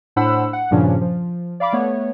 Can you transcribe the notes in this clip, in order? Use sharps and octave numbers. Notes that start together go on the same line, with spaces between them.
A2 D4 C5 F#5 B5 E6
F#5
G2 A#2 C#3 F3 C#4 D4
F3
D5 F5 B5 D6
A3 B3 C#5